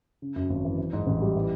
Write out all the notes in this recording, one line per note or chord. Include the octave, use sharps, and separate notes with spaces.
C#3
F#2
G#1
E3
E3
G#2
A1
G3
E3